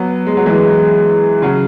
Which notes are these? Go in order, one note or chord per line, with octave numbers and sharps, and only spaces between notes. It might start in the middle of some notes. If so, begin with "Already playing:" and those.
Already playing: F#3 B3
G#3
F#3
E3 G#3
C#3 F#3